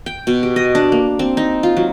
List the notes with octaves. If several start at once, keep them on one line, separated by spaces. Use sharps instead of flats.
G5
B2
G4
D#5
D4
A#3
C4
D#4
F4
F#3